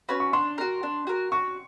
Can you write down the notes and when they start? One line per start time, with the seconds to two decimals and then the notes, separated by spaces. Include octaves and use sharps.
0.09 C#4 F#4 B4
0.20 C#6
0.33 D4 C6
0.58 F#4 A#4
0.83 D4
1.07 F#4 A#4
1.32 F#4 C#6